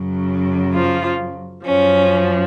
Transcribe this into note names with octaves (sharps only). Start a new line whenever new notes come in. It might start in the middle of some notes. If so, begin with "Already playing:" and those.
Already playing: F#2 C#3 F#3
F3 F4
F#2 F3 C#4